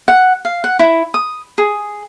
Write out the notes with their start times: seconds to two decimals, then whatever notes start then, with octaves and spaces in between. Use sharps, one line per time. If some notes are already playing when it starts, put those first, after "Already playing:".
0.08 F#5
0.45 F5
0.64 F#5
0.79 E4
1.14 D#6
1.58 G#4